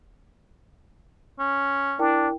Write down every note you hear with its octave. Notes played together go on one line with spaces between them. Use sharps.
C#4
D4 E4 A#4 G5